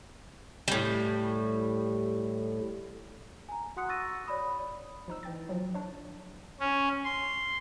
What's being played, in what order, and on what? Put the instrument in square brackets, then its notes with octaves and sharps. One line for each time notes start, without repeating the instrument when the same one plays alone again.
[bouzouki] A2 G3
[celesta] G#5 A#5
F#4 F#5 C6 D#6 F#6 C#7
C#6 E6 A6 A#6 D#7
C#5 D5 B5 D#6
[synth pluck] F3 D#4 E6
E3 G5 A6
F3 F#3
D4 C#5
[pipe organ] C#4
C6